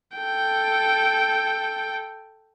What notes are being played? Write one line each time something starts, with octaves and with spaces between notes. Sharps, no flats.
A4 G5